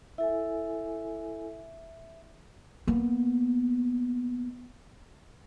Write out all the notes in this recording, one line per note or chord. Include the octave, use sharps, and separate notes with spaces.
E4 A4 E5 G#5
A#3 B3